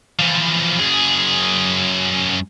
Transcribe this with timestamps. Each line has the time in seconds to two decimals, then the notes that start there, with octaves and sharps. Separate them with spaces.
0.19 E3 F3
0.79 F#2 G#4